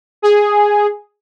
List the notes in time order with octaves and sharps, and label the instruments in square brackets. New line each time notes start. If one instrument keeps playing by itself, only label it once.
[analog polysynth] G#4